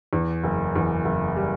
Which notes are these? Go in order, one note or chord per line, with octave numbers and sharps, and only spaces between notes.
E2
F#1
E2
F#1
G3